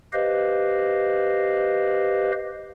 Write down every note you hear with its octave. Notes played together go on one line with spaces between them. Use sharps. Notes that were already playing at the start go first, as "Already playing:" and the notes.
G4 B4 C5 D#5 F5